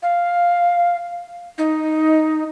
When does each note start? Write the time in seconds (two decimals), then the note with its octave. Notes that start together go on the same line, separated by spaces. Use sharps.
0.03 F5
1.58 D#4